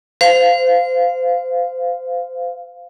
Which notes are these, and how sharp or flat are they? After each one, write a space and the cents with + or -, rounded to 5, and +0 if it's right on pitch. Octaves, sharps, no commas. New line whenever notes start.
C5 -25 F5 +0